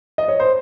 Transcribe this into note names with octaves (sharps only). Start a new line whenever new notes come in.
D#5
C#5
C5